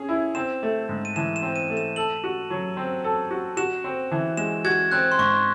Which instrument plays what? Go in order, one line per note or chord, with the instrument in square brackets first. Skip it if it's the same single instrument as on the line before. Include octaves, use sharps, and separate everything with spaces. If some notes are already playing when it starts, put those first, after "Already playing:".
Already playing: [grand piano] C#4 G#4
E4
[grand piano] C4 [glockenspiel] E7
[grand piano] A3
G#2
[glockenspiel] D#7
[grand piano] E3 [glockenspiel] E7
[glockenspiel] E7
[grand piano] C4
[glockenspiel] D#7
[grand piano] A3
[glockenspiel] E7
[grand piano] A4 [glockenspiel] F#7
[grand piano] F#4
F#3
C4
A4
F#4
[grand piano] F#4 [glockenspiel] E7
[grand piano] C4
E3
[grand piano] G#3 [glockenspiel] E7
[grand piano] F#4 [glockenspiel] G#6
[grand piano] C4 [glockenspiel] F#6
[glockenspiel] C6
[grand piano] G#2 [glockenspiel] C#6